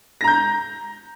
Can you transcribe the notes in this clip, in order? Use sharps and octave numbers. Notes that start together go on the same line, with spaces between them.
A#5 G6 A#6